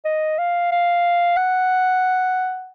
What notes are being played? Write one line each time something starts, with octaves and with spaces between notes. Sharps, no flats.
D#5
F5
F5
F#5